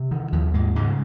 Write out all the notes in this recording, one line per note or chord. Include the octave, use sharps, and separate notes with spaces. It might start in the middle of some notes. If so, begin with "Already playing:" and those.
Already playing: C3
D#3
D#2 F3
G#2 G#3
G#2 C#3 G#3